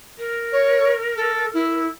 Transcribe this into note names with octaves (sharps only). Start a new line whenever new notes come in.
A#4
C#5
A4
E4